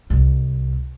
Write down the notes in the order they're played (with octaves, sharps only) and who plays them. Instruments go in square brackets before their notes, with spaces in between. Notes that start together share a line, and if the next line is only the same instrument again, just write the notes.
[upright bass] C2